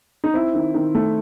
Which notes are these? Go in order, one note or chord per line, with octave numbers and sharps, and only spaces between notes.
D#4
C4 E4
D#3
D#3
A3